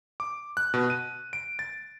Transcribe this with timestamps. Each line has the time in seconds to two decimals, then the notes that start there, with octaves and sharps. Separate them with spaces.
0.20 D6
0.57 F#6
0.74 B2
0.90 D#7
1.33 D7
1.59 A6